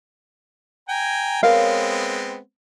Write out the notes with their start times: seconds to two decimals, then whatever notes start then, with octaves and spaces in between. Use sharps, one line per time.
0.89 G5 G#5 A#5
1.43 G#3 B3 C4 A#4 C#5 F5